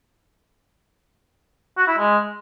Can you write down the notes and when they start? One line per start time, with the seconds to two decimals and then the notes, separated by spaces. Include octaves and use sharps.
1.78 F#4
1.88 E4
1.98 G#3